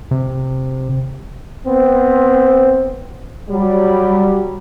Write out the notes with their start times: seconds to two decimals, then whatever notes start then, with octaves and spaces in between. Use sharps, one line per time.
0.11 C3
1.66 B3 C4
3.49 F#3 G3